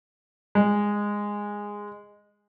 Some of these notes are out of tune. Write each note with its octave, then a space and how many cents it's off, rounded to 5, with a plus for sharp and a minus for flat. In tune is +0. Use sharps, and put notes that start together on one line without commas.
G#3 -10